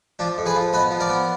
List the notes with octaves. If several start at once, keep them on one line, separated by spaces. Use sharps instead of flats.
F3 D4
F2
G#4 B4
F3
B3 B4 D#5
F3
A#4 D5
B3